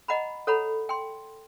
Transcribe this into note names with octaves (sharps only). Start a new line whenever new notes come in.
D#5 F#5 A#5 B5
A4 C#5 F#5 A#5 B5
G5 C6